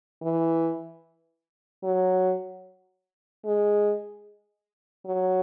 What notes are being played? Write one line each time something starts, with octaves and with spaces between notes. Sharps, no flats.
E3
F#3
G#3
F#3